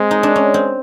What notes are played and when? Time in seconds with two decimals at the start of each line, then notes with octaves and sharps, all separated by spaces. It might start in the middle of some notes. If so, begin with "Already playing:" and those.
Already playing: G#3 C4
0.11 D#4
0.23 D4
0.36 C#4
0.54 C4